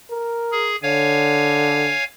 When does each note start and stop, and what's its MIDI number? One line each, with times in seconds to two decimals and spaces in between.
0.10 0.74 70
0.52 0.76 68
0.83 1.93 50
0.83 2.04 73
0.83 2.04 77
0.83 2.04 80